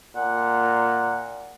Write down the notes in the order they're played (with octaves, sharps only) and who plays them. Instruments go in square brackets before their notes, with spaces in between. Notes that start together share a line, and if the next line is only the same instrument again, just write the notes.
[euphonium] A#2 [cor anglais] F#5